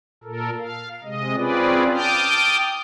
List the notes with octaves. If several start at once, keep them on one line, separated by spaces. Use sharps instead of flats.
A#2 A4 A#4
F5
C3 G#3 D#5
C4 C#4 F4 G#4 B4 D5
G5 A5 D6 D#6 F6 G6